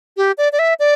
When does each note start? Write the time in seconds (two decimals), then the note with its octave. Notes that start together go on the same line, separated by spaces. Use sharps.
0.17 G4
0.38 D5
0.52 D5
0.59 E5
0.79 D5